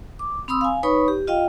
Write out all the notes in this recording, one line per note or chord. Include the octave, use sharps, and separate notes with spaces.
D6
C4 B5 C6 D#6 E6
F5 G#5
D#4 B4 C#5 B5 C#6 D#6
G4
F4 D#5 F5 G5